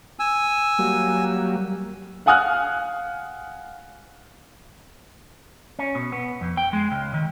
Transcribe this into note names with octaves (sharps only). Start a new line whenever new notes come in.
G#5 E6
F#3 G3 A#3
F5 F#5 G#5 D#6 F6 F#6
C#4
B2
B3
F2
G5
G#3
C#2
D#3